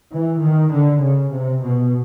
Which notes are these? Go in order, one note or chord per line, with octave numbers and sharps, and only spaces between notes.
E3
D#3
D3
C#3
C3
B2